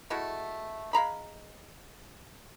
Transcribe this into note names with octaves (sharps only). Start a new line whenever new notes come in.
G#3 A3 E4 F#4
G#3 F5 A#5 B5